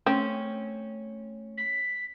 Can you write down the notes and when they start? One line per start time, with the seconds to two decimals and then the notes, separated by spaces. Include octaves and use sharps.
0.06 A3 C4 C#4
1.58 B6